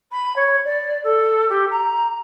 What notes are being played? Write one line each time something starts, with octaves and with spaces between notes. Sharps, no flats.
B5
C#5
D5
A4
G4
A#5